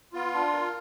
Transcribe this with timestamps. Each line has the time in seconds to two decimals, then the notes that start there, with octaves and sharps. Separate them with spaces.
0.13 B3 F4
0.34 D4
0.53 A#4